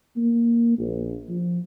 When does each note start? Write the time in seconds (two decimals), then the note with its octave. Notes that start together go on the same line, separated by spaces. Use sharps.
0.16 A#3
0.78 A#1
1.28 F3